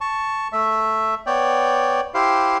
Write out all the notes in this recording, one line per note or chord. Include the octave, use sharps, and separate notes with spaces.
A5 C#6
A3 E5
B3 C#5 D5 G5
E4 G4 C5 F5